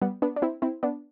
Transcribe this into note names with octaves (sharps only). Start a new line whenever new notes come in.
G3 B3
B3 D4
D4
C4 E4
C4 E4
B3 D4